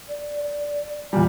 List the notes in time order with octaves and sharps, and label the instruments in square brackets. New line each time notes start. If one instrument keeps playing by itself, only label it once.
[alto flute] D5
D5
[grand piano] E2 A#2 G3 [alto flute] G#5